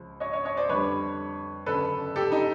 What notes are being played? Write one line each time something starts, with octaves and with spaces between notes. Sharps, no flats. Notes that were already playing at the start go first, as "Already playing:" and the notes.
Already playing: C#2 C#3 F3
C#5 D#5
C#5 D#5
C#5 D#5
C5 D5
F2 D3 G3 B4 C#5
G1 F#2 C#3 A4 B4
G4 A4
D#4